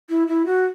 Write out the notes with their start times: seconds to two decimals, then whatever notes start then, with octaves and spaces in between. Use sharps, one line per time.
0.09 E4
0.28 E4
0.46 F#4